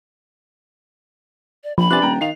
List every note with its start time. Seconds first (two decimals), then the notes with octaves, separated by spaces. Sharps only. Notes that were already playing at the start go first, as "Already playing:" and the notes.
1.64 D5
1.78 A#1 F3 B5
1.91 C3 D4 B4 G#5 F#6 A6
2.02 D#1 G5 A#5
2.21 D#3 F5 C7 F7